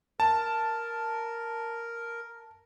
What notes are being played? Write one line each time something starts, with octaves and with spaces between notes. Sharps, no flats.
A#4 A5